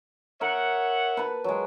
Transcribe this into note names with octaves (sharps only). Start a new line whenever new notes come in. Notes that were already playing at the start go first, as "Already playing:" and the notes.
A#4 C#5 E5 F#5
B4 A5 B5
F#3 G#3